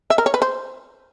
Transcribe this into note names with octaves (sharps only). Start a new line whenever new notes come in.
E5
A#4
C#5
B4
C5